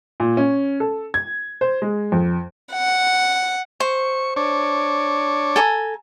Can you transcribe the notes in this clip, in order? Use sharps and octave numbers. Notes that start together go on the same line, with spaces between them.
A#2
C#4
A4
G#6
C5
G#3
F2
F#5
C5 C#6
D4 C#5
A4 G#5 A#5